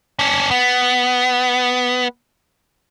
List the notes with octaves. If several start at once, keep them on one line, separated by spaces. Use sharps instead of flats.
C#4 D4
B3